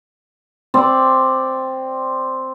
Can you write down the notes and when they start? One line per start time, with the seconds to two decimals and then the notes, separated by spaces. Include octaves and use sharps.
0.74 C4 D5